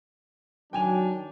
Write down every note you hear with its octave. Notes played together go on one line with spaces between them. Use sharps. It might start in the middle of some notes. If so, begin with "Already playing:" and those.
D#3 F#3 D4 G5 G#5 F7